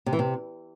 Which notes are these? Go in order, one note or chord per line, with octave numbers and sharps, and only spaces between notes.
C3
E3
C3